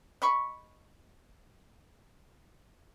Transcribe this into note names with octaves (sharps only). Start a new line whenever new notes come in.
D#5 B5 C#6